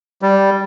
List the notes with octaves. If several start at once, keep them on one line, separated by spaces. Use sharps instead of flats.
G3